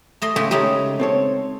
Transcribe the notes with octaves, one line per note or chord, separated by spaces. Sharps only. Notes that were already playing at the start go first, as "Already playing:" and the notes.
A3 D#5 C6
C#3 G#3 A3 G4
C#3 G#3 A3 D#4 G4
C4 A4 C#5